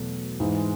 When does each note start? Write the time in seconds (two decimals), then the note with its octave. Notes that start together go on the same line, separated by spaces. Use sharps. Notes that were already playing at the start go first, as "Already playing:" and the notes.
Already playing: E2 B2 F#3 A3
0.40 G#2 E3 G#3